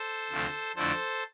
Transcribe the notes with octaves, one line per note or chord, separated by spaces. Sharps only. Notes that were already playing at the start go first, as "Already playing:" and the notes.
Already playing: A4 C5
D2 C3 F3 A3
F2 D3 A3 E4 A4 C5